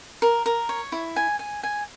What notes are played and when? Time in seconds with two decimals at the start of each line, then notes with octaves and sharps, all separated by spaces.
0.22 A#4
0.46 A#4
0.69 C#5
0.92 E4
1.16 G#5
1.39 G#5
1.63 G#5